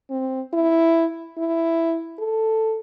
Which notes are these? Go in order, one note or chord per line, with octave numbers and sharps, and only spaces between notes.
C4
E4
E4
A4